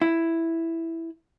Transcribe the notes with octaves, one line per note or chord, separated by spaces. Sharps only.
E4